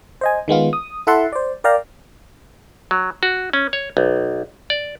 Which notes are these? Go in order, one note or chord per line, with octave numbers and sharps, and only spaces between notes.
C5 D#5 G#5
D#3 G#3 B3 F4
D#6
E4 A4 E5 F#5 A5 C6
C5 D5
A#4 D5 F5 G5 A#5
F#3
F#4
C#4
C#5
B1
D5